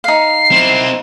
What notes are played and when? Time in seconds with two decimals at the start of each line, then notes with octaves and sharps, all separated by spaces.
0.04 D#4 F5 C7
0.52 C4 E4